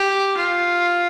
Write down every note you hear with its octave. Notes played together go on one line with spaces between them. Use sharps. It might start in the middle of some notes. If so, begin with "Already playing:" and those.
Already playing: G4
F4